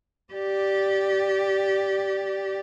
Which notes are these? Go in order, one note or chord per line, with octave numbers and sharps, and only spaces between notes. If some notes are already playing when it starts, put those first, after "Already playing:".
G4 D5